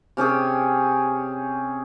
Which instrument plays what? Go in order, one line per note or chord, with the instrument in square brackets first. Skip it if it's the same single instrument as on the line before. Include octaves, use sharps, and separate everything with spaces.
[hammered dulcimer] C3 C#4 G4 G#4